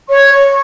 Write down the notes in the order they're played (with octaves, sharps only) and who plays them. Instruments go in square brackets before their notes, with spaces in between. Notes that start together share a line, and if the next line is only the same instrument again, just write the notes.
[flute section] C#5 C#6